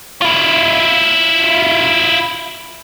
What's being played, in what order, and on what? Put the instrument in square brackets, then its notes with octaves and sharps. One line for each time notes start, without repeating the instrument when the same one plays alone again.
[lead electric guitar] E4 F4